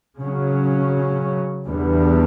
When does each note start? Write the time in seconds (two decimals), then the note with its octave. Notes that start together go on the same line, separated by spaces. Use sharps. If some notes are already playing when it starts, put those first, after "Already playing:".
0.19 C#3 F#3 C#4
1.67 E2 D3 G3 B3